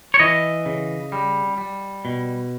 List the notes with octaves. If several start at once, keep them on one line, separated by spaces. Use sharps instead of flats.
C#5
E3 D#5
C#3
G3
G3
B2